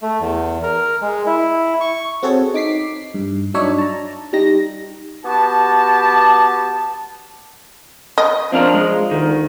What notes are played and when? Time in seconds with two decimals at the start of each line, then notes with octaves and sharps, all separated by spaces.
0.02 A3
0.20 E2
0.63 A#4
1.02 G#3
1.26 E4
1.81 C#6
2.23 C4 F#4 G#4 A4 C#5
2.54 D#4 D6 B6 C7
3.14 G2
3.54 F#3 D4 D#4 C#5 E5
3.78 A5 A#5
4.33 G3 D#4 A#6
5.23 B3 F#4 G4 A5
8.18 D#5
8.53 F3 C4 D4 A#4
8.74 G#3
9.11 D2 D#3